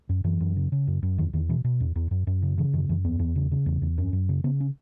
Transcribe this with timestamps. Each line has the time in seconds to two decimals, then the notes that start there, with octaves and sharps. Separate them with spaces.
0.09 F#2
0.24 F#2 E3
0.41 F#2
0.56 C#3
0.72 C#3
0.87 F#2
1.03 F#2
1.18 E2 D#3
1.33 E2 D#3
1.49 B2 E3
1.64 B2
1.80 E2
1.96 E2
2.11 F#2
2.27 F#2
2.42 C#3
2.58 C#3 E3
2.73 F#2 D#3
2.89 F#2 E3
3.04 E2 B3
3.19 E2
3.36 C#3
3.51 C#3
3.66 E2
3.82 E2
3.98 F#2 C#4
4.13 F#2
4.29 C#3
4.44 C#3 B3
4.60 C#4